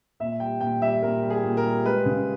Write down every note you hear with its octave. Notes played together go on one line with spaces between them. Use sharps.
A#2 E5
G3 G5
A#2 G5
G3 E5
A#2 A#4
G3
G#4
A#2
A#4
G3
G#3 B4
C#3